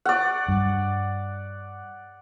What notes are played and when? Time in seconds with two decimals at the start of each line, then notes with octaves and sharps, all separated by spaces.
0.05 D5 F#5
0.48 G2